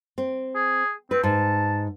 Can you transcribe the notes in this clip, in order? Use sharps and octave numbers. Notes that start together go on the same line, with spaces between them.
C4
G#4
C4 B4
G#2 A5